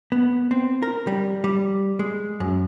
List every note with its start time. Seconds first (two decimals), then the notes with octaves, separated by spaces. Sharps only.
0.12 B3
0.51 C4
0.82 A#4
1.07 G3
1.44 G3
1.99 G#3
2.40 F#2